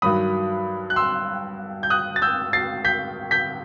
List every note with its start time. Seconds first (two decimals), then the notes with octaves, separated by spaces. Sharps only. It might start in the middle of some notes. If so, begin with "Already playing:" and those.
0.02 G2 D#3 F#3 B5 D#6
0.90 F#6
0.96 C6 E6
1.83 G6
1.90 D#6 F#6
2.16 A6
2.22 E6 G6
2.53 A6 C7
2.85 G6 B6
3.31 G6 B6